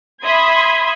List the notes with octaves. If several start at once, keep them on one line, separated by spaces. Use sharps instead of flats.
E5 B5 C6 D#6 G#6